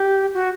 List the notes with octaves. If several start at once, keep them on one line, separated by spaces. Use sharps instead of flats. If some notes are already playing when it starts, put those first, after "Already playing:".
Already playing: G4
F#4